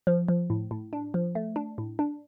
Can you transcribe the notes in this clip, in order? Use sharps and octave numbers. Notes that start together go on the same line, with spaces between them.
F3
F3
A2
A2
D4
F3
A3
D4
A2
D4